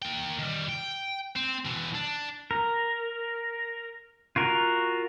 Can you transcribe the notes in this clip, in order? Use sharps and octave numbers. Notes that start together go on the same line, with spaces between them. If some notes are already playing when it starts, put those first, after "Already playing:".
A#3 G5
D#3 G3
G5
C4
B2 E3
D4
A#4
F4 F#4 A#4